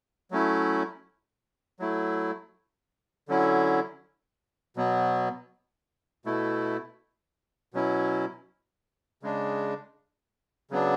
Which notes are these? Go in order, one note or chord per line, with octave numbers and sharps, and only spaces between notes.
F#3 A3 C#4 E4
F#3 A3 E4
D3 F#3 C#4 E4
B2 F#3 B3
B2 A3 E4
B2 F#3 C#4 E4
C#3 G#3 D4
C#3 F#3 B3 D4